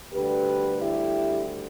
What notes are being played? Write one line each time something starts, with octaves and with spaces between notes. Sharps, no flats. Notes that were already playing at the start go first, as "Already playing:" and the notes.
D2 D3 G3 G4 B4
E4 G4